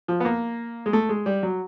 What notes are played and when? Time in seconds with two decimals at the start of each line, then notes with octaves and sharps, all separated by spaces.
0.08 F3
0.20 B3
0.25 A#3
0.86 G#3
0.93 A3
1.09 G#3
1.26 G3
1.43 F#3